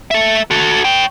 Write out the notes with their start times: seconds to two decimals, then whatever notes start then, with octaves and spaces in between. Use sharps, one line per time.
0.11 A4 E5
0.51 F#4 A4
0.85 C#5 G5